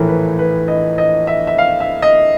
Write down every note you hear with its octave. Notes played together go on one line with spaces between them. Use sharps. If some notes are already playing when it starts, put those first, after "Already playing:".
Already playing: A#1 A2 E3 A3 A#4
B4
B4
D#5
D#5
E5
E5
F5
E5
D#5